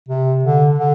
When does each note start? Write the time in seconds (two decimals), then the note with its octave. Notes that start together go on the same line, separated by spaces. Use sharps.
0.08 C3
0.43 D3
0.79 D3